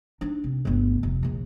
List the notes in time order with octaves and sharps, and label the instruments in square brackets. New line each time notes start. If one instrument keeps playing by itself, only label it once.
[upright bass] D4 D#4
C3
G1 D2
F1
A#1 D#2